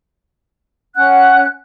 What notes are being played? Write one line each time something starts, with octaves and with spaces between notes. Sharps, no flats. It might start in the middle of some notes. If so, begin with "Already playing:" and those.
C#4 F#5 F#6